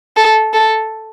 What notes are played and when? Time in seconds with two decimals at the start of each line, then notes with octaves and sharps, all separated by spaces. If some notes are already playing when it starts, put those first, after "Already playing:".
0.17 A4
0.53 A4